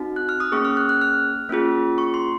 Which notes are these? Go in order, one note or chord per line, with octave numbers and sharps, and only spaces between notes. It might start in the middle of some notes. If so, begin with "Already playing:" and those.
Already playing: C4 D#4 F#4
F#6
F6
D#6
A#3 C#4 G#4 C#6
F6
F#6
F#6
F6
A#3 C#4 F4 G#4
C#6
C6